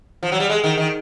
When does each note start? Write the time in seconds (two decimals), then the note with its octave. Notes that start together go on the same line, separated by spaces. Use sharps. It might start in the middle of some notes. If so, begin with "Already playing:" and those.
0.23 F3
0.32 F#3
0.40 G3
0.49 G#3
0.64 D#3
0.77 D#3